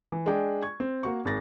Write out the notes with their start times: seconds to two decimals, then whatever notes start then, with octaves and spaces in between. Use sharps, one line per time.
0.12 E3
0.26 G#3 D4 D5 G5 G#5
0.62 C#6 G#6
0.80 C4
1.03 A#3 F#4 C#6
1.25 G#1 G#4 A6 A#6